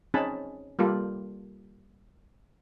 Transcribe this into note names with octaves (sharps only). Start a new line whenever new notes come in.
C4 C#4 D#4 G#4 A5 B5
G3 A#3 F4 G4 A4